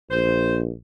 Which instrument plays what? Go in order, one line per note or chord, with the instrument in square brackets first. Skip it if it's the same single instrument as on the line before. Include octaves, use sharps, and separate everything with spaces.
[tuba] A#1 [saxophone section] C5